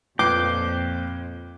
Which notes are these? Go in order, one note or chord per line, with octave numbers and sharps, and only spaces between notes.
F2 A#2 B4 G5 D6 C7